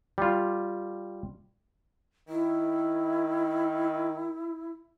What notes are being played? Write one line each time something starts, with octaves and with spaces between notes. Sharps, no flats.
G3 F4
D#3 E4